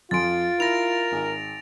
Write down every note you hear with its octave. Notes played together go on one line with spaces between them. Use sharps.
F2 F4 G#5 C6 A6 D7
E4 A#4 A#6 F7
G#1